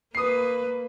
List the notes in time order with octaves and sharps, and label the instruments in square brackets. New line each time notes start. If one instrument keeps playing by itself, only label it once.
[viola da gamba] A#3 B4 [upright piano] D#6 C7